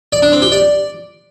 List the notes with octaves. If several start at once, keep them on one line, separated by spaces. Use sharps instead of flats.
D5
D4
C4
G4
D5